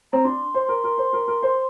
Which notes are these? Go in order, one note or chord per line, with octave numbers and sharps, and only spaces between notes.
C4 A#5
D4 C6
C5
A#4
A#4
C5
A#4
A#4
C5